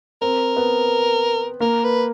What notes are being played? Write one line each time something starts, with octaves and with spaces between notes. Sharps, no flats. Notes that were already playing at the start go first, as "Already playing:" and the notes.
C4 A#4
B3
A#3 A#4
B4